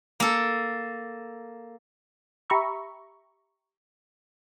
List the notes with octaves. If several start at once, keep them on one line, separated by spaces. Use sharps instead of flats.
A#3 A4
G4 E5 A#5 B5 C#6 E6